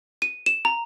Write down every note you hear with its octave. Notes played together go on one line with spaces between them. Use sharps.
D#7
E7
A#5